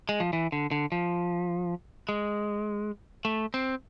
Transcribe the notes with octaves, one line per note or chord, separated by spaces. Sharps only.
G#3
F3
E3
D3
D3
F3
G#3
A3
C4